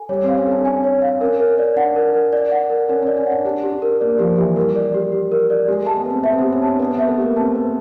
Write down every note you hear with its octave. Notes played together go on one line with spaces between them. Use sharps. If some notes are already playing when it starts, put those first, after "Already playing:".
Already playing: A4 G#5
G3 C#5
C4 F5
C#4
D4 A4
C#4 G#5
C#5
F5
C#4 A#4
A#4
D5
D4 F#5
A#4
A#4
D5
F#5
A#4
C#4 A#4
C#4 D5
C#4
D4 F#5
D4 G4
G4
D4
A#4
A#3 D5
F3 G4
E3 G4
G3 A#4
D5
G4
G4
A#4
D5
G#3 G4
A3 A5
B3
C4 B4
B3 E5
C4
B3 G4
C#4
D4 A5
B3 B4
B3 E5
A3
A#3 G4
C4 A5
B4